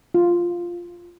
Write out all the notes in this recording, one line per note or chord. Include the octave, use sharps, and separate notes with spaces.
F4